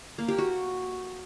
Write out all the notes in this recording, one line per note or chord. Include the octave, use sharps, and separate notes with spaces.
A#3
G4
F#4